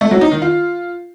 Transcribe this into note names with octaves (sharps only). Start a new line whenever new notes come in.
A3
F#3
D#4
D#3
F4